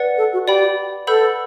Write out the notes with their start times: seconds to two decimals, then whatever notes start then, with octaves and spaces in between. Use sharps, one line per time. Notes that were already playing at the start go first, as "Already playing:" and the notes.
Already playing: B4 D5 F#5
0.18 A4
0.33 F#4
0.48 G4 D5 G5 B5
1.07 A4 B4 F#5 B5 E6 G6